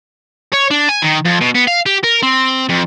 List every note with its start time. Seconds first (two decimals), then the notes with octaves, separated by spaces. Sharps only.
0.53 C#5
0.71 D4
0.89 G#5
1.03 D#3
1.26 F2
1.41 B2
1.55 B3
1.68 F5
1.86 G4
2.04 A#4
2.23 C4
2.70 F2